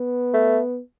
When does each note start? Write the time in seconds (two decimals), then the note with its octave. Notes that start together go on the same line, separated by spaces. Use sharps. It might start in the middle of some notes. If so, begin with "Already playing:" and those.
Already playing: B3
0.33 A3